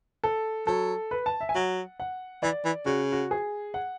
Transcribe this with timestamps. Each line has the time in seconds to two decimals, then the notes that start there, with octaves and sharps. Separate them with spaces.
0.24 A4
0.67 F#3 A4
1.11 B4
1.26 A5
1.41 E5
1.49 G#5
1.55 F#3 F#5
2.00 F#5
2.43 E3 D5
2.65 E3
2.86 C#3 F#4
3.12 F#4
3.31 G#4
3.74 F#5